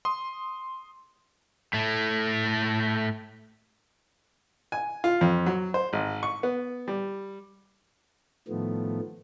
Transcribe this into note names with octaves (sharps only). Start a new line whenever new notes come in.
C6 D#6
A2 A3
G#5
F4
F2
F#3
C5
G#1
C#6
B3
G3
A2 D#3 F3 A3 B3